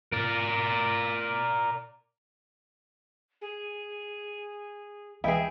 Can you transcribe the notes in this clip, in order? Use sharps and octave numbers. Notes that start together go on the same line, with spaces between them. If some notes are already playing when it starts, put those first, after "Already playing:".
A#4 D5
G#4
C#2 E3 E4 G#4 D#5 G5